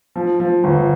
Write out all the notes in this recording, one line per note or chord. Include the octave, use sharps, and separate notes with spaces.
F3
F3
G1